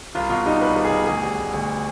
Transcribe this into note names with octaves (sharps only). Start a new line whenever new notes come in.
C2 F4
B2 F4
G3 D#4
C2 B4
G3
G#4
B2
D2 G#4
G3
D2
D2